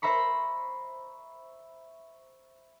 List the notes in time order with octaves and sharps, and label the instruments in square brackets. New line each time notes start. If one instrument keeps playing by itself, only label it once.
[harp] C5 E5 A#5 B5 C#6